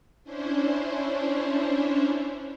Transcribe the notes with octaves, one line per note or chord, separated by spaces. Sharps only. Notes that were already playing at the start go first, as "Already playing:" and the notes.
C#4 D4 E4 C5 C#5